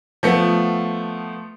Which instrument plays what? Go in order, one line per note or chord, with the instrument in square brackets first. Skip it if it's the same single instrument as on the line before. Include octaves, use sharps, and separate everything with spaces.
[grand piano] F3 A3 B3